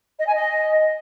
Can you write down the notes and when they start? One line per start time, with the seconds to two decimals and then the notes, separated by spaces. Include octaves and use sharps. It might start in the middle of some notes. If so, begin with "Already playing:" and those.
0.19 D#5
0.27 G#5
0.34 D#5